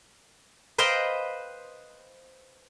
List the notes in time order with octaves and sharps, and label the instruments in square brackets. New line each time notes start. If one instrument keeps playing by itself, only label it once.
[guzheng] B4 C5 D#5 F5 G5 C6